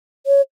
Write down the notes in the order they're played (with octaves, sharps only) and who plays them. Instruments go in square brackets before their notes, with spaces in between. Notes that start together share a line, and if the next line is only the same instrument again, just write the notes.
[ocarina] C#5